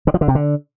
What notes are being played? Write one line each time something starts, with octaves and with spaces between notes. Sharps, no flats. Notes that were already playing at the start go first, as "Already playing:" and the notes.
D3
F3
D3
C3
D3